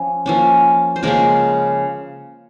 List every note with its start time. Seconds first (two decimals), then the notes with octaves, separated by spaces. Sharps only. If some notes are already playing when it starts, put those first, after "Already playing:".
Already playing: F3 C#4
0.26 F3 A#3 C#4
0.96 C5
1.03 C#3 F3 G#3 A#3 C#4 A#4